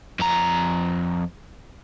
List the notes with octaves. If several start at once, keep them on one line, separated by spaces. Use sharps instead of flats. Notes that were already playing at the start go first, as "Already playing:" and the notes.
F2 A#5